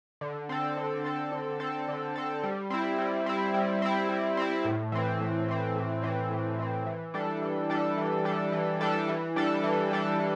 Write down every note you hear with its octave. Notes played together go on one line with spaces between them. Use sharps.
D3
C4 A4
D3
C4 A4
D3
C4 A4
D3
C4 A4
G3
C4 E4
G3
C4 E4
G3
C4 E4
G3
C4 E4
A2
E3 C4
A2
E3 C4
A2
E3 C4
A2
E3 C4
E3
G3 D4 A4
E3
G3 D4 A4
E3
G3 D4 A4
E3
G3 D4 A4
E3
G3 D4 A4
E3
G3 D4 A4
E3